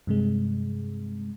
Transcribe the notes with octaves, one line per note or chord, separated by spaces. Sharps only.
G2 C3 G#3